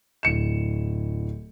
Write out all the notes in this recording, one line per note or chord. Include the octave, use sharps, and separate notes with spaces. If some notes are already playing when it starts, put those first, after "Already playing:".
D1 C#7 E7